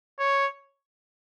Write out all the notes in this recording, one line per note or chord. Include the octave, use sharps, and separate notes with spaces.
C#5